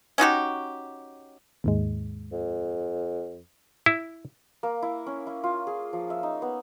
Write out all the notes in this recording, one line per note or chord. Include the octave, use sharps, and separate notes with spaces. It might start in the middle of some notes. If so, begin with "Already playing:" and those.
C#4 D#4 F#4 G4
D#2 G#2 G#3
F2
E4
A#3
E4
C#4
E4
F4
G#4
F3
E5
D#4
B3